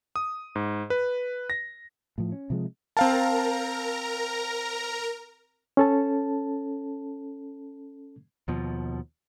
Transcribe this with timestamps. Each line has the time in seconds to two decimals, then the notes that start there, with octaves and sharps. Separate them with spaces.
0.16 D#6
0.56 G#2
0.90 B4
1.50 A#6
2.18 A2 F3
2.32 C#4
2.50 C3 F3 G#3
2.97 C4 A#4 F5 A5 A#5
5.77 C#4 A4 A5
8.48 D#2 B2 F3